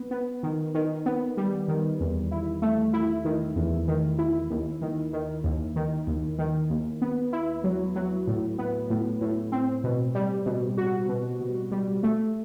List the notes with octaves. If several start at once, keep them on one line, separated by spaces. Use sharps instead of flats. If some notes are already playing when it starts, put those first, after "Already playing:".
Already playing: B3
B3
D#3
D#3
B3
G3
D#3
E2
E4
A3
E4
D#3
E2
D#3
E4
D#2
D#3
D#3
D#2
D#3
D#2
D#3
D#2
B3
E4
F#3
F#3
A2
B3
A2
A2
C4
B2
G3
B2
F#4
B2
B2
G3
A3